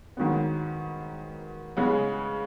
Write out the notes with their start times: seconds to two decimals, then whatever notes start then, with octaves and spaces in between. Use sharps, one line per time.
0.17 G#2 D#3 F#3 B3
1.77 C#3 G#3 B3